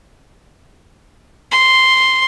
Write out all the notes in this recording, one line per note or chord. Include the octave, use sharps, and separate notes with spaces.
C6